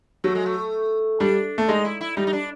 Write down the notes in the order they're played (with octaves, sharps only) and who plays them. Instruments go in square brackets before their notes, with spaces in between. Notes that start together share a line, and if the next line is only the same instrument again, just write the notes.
[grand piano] F#3 [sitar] A3
[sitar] G#3
A3
[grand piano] G3 [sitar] D4
[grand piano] A3
[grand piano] G#3 [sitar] D#4
[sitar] E4
E4
[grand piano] G3 [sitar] D#4
[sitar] D#4
D4